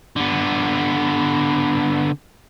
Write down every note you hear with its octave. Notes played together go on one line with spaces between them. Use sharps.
D3 B3